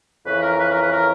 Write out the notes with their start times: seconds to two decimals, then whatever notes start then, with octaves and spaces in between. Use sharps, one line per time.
0.25 F2 C#3 E3 B4
0.42 A#4
0.59 B4
0.70 A#4
0.81 B4
0.91 A#4